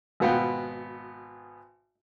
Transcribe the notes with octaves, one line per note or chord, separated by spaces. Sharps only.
G#1 B2 B3 F4 G5